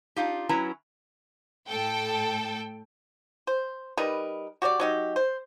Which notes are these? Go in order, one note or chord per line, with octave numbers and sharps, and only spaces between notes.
D4 D#4 F4 G4
F#3 C#4 E4 B4 A#5
A2 A4 G5
C5
G3 D#4 A#4 B4
F#4 G4 C#5 D5
F#3 D#4 G4
C5